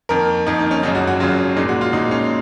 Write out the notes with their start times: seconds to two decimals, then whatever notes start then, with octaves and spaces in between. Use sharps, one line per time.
0.09 F2 D#3 A#3 A#4
0.47 F2 D#3 A#3 D#4
0.59 D#4
0.71 C#4
0.83 G#1 F#2 C#3 F#3 D#4
0.95 F#4
1.07 F#4
1.20 G#1 F#2 C#3 F#3 F4
1.57 A#1 A#2 G#3 D#4
1.69 F#4
1.81 F4
1.93 A#1 A#2 G#3 D#4
2.11 C#4